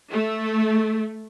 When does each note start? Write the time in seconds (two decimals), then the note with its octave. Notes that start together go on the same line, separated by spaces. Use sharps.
0.11 A3